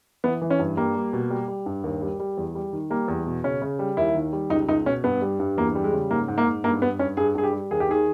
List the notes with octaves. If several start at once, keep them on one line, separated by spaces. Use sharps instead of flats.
E3 B3
E3
C#4
G2
G3 A#3
G3
B2
G3
G3
G2
D#2
G3
G3
E2
G3
D#3
G3 A#3
E2
B2
C#3 C#4
C#3
G3
D#2 E4
D#3
G3
C#2 D#4
C#2 D#4
B2 C#4
G2 B3
G3
G2
E2 A#3
G3
G#3
C#3
G#2 A#3
G#2
A#3
G#2
G2 A#3
G2 B3
G2 C#4
G2 G#4
G2 G#4
G4
G3
D#2 G#4
G4
D#3 G#4